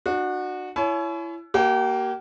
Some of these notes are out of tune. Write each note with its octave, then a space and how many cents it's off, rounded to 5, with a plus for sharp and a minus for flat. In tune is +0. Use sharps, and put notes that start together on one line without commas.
D4 +35 F#4 -15
E4 +25 C#5 +15 G#5 +45
A#3 +0 G4 -40 G#5 +0